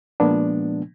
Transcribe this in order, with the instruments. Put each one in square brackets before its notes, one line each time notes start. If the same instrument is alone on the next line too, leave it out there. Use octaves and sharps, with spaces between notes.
[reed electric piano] A#2 F3 G#3 A#3 B3 D4